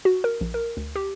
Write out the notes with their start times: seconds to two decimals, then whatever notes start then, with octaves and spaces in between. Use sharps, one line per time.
0.05 F#4
0.24 A#4
0.41 A#1
0.54 A#4
0.77 D2
0.96 G4